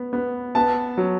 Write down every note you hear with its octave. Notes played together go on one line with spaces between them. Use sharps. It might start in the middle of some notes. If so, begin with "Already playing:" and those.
Already playing: B3
B3
B3 A5
F#3